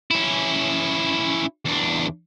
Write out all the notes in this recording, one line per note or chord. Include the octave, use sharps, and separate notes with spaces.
C#4 E4
E2 D4